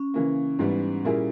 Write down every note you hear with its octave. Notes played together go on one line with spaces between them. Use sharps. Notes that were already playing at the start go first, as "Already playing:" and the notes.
Already playing: C#4
C#3 E3 A#3
G#2 E3 G3 B3
A#2 G3 A#3 E4 G#4